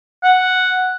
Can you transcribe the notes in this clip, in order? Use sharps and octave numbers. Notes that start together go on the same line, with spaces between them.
F#5